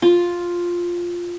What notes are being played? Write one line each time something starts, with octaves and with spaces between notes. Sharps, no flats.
F4